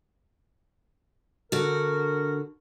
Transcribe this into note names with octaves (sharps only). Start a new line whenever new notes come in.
D3 F#4 A#4